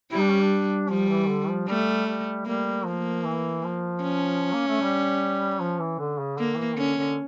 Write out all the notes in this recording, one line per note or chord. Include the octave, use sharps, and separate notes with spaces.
G3 E4
D4
C#4
D4
F3 G3
E3
D3
F3
G3 A3
G3
G3 A#3
F3 A#3
E3
F3
C#4
A#3
A3
G3
F3
E3
D3
C#3
D3 A#3
E3
D3 C#4
D3